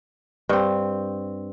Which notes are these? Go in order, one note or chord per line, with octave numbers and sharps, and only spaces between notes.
G2 C4